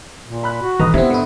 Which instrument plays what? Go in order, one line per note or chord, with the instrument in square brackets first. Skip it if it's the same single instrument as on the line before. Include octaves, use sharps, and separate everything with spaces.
[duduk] A#2
[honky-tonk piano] B5 F#6
[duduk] F#4
[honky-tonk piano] B1 B4 [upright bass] E3 [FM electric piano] D#5 A#5
[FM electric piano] C3 C4 [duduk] B3 [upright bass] D4 [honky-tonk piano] E4 E5
[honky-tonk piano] G#2 [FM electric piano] D3 E4